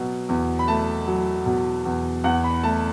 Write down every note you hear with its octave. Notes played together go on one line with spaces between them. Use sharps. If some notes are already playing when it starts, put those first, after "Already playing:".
Already playing: B2 F#3
E2
B5
A3 A5
F#3
B2
E2
E2 F#5
B5
A3 A5